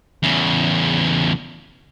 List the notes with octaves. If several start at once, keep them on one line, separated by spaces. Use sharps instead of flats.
E2 C#3